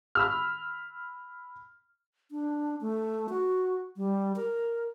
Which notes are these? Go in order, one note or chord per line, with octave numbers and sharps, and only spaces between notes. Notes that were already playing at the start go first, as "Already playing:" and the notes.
B5 E6 F6
D4
A3
F#4
G3
A#4